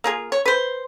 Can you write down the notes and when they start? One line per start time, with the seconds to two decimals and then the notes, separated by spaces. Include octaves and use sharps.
0.04 A#3 F4 G#4
0.32 C#5
0.46 B4 C5